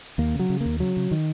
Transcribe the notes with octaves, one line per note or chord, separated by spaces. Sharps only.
D#2 A#3
C#3 F#3
C#3
D#2 A#3
C#3 F#3
C#3
D#3